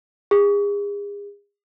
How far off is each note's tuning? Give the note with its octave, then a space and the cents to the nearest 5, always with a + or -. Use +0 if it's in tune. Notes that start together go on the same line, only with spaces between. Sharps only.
G#4 -35